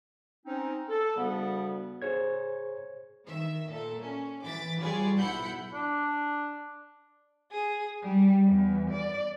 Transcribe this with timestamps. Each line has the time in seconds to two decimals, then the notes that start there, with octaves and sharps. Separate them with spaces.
0.46 C4 C#4 D#4
0.89 A4
1.16 D2 C#3 G3 B3
2.02 G#4 C5 C#5 G#6
3.26 D#3 E5
3.67 A#2 A4
4.03 C#4
4.43 E3 D6 A6 B6
4.80 G3 F4 G#4 B4 C#5 D5
5.18 B1 E4 F#5 B5 G6 C#7
5.73 D4
7.52 G#4
8.02 G3
8.46 E2
8.90 D5